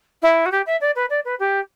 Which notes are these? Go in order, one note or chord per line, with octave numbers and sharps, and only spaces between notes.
E4
F#4
G4
E5
D5
B4
D5
B4
G4